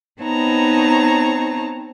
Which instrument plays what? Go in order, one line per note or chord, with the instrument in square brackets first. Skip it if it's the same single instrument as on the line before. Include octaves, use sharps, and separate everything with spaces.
[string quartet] B3 C4 D#4 C#5 A5 A#5